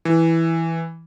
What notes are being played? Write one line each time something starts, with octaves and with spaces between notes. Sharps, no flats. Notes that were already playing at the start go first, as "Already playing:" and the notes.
E3